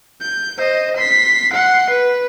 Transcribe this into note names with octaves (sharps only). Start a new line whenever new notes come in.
G6
C5 D#5
C6 B6
F#5 C6
B4